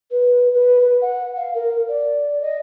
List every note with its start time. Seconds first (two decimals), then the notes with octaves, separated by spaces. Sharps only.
0.11 B4
0.53 B4
0.79 B4
1.01 F#5
1.36 F5
1.54 A#4
1.88 D5
2.41 D#5